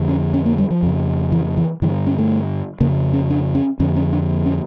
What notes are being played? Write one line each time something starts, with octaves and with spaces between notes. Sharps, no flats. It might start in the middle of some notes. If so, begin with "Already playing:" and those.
Already playing: F2 D3
C#4
C#4
A#3
G3
F3
F2 C#3
E3
E3
G2 D3 E3
C#4
A3
F2 C#3 A#3
C#4
D4
C#4
F2 D3 C#4
C#4
D4
C#4